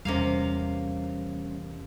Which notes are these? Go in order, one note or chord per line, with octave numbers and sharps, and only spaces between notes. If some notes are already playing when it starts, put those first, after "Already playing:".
E2 C3 G3 A#3 C#4 F5